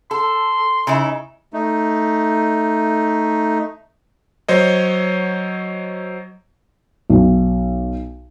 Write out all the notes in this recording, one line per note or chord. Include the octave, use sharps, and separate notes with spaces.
A4 C6
C#3 D#4 E4
A3 D#4
F#3 C5 C#5 D#5
B1